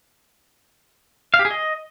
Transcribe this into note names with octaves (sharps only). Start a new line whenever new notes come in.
F5
G4
G#4
D#5